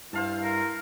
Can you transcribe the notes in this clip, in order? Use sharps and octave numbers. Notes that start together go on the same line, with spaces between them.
G2 E4 C5 F5 A5
A#4